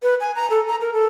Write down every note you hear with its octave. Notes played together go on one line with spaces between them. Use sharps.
B4
G#5
A#5
A4
A#5
A#4
A4